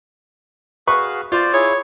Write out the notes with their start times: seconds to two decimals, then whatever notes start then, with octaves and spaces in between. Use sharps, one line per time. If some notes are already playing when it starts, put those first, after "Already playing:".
0.87 F#4 G#4 B4 F5 C#6
1.32 F4 C5 D5
1.53 E4 G#4 C#5